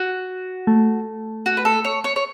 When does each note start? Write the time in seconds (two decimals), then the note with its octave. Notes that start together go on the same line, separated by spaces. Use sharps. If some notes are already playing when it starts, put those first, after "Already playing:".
Already playing: F#4
0.67 A3
1.46 F#4
1.57 B4
1.65 A4
1.84 C#5
2.04 C#5
2.16 C#5